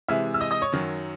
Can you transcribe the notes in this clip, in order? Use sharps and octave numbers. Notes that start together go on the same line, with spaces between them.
C3 E3 G#3 E5 E6
E6
D#5 D#6
D#5 D#6
C#5 C#6
F#2 D#3 F#3